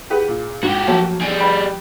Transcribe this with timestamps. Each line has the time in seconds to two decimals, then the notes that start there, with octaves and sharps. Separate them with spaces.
0.10 E4 G4 G#4 B4 F#5
0.28 A#2
0.63 G#2 F#4 G4
0.87 F3 F#3 A3 A#3 C#5 A5
1.21 G3 G#4 D7
1.40 G4 B4 B5